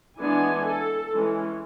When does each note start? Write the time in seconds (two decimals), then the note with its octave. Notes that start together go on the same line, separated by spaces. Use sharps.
0.18 E3 G#3 B3 D4 G#5
0.65 A4
1.13 E3 G#3 C#4